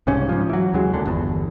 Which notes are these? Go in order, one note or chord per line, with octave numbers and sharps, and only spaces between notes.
C2 G#2 C#3 C#4
G#2 F3
E3 F#3
D#2 C#3 F#3 G#3
E1 D#2 D3 D4
G1 E2